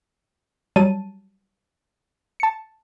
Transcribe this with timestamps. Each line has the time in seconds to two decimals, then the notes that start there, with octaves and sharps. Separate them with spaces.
0.76 F#3 G3 A5 D#7
2.40 A5 C#7